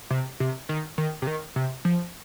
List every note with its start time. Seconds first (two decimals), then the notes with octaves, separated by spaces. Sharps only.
0.10 C3
0.40 C3
0.69 D#3
0.98 D#3
1.22 C3
1.27 D#3
1.56 C3
1.85 F3